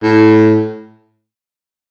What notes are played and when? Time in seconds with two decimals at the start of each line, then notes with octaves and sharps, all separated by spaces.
0.03 A2